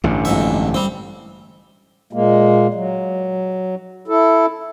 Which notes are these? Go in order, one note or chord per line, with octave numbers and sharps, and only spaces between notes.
A1 G2 D3
F2 G#2 E5
G3 C4
A#2 G#3 A#3
F#3
E4 A4